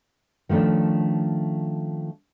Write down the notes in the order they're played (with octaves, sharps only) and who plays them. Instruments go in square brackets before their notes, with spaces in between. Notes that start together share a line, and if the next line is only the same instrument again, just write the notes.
[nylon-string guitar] D#3 F3 A3 C#4 D4